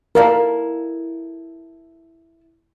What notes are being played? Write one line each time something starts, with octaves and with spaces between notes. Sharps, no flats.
E4 A4 A#4 D5 F5